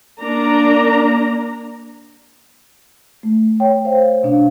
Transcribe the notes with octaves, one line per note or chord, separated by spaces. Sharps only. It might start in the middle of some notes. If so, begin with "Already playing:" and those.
A#3 D4 A#5
A3
C#5 G5
C5 F5
B2 D4 F5